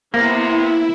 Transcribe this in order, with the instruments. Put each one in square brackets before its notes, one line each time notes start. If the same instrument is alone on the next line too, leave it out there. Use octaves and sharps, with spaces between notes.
[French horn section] C3 [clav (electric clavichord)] A#3 [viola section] B3 [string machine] E4